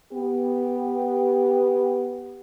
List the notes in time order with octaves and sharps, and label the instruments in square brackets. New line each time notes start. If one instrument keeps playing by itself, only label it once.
[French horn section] B3 G4